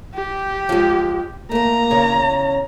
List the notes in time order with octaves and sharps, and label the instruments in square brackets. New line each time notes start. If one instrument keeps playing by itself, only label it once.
[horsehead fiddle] G4
[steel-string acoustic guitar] F3 G#3
[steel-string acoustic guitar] A3 A#4 [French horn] A#3 [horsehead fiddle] A#5
[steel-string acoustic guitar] E2 C#3 C#5